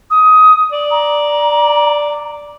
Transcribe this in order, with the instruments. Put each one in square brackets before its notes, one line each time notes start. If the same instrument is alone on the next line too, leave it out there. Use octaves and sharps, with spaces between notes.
[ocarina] D#6
[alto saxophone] D5
[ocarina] A#5